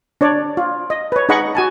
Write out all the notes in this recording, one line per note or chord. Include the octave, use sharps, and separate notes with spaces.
D4 C#5 D5
F4
D#5
B4 C#5
D#4 G#4 D#5 F#5 B5 C#6
F#4 G#5 A5